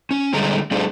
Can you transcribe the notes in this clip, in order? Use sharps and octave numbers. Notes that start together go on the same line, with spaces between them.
C#4
D3 G3 G#3 A#5
G3 A3 D4 G#4